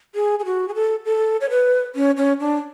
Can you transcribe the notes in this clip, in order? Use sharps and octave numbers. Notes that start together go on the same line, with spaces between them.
G#4
G#4
F#4
G#4
A4
A4
C#5
B4
C#4
C#4
D4